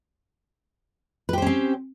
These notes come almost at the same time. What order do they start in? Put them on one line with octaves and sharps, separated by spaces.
B4 G4 C5 C#4 C4